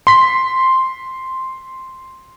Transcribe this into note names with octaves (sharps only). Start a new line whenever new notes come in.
C6 B6